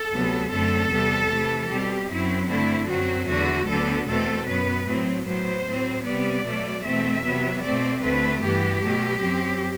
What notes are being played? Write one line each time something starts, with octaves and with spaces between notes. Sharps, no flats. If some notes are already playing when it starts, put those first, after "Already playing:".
Already playing: A4
D2 C3 F#3 B3
F#2 D3 A3 C4 A4
E2 C3 G3 B3
C3 E3 A3
B2 G3 C4 G4
F#2 F#3 C4 E4
G2 D3 A3 C4 E4
F#2 F#3 C4 F#4
E2 D3 A3 F#4
D2 D3 F#3 B3 A4
E2 B2 A3 C4 A4
F#2 F#3 B3 B4
A2 F#3 C4
A2 F#3 B3 C5
A2 F#3 C4
C3 G3 B3 D5
B2 F#3 A3
E2 B2 A3 C4 E5
C3 F#3 B3
B2 A3 C4 D5
D2 D3 A3 C4 B4
G2 E3 B3 G4
B2 F#3 A3
F#2 F#3 C4